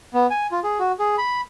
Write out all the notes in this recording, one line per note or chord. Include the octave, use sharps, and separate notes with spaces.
B3
G#5
F4
G#4
F#4
G#4
B5